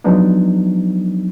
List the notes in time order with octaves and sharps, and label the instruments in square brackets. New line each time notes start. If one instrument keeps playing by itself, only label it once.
[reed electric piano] F3 F#3 G#3 B3 D4 D#4